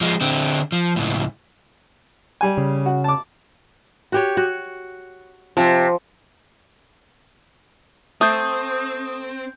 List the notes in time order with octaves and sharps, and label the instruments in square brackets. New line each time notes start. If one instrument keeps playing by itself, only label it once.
[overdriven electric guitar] F3 G#3
D3 C4
F3
C#2 A2
[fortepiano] G3 G#5
[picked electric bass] C#3
[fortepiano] F#4
A5 D6
[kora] F#4 G4 C#5
F#4
[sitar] C3 [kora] F3
[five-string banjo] A3 [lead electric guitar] C4 [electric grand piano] D#6 G6